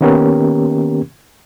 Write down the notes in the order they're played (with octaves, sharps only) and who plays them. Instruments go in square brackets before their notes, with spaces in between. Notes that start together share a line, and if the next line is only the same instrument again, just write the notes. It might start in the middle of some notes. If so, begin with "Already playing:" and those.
[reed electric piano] D#3 A#3 B3 C#4 G4 A#4